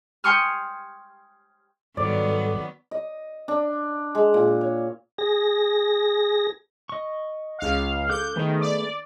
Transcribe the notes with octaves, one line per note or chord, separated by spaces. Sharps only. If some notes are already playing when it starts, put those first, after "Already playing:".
G5 G#5 C6 C#6 D#6 F6
G#2 D#3 F#3 G3 B3 A4 D5
D#5
D4
G#3
A#2
C#5
G#4 A#6
D#5 C#6
C#2 F5
A4 D6 F#6 G6
D#3 A3 B3 G#4
D5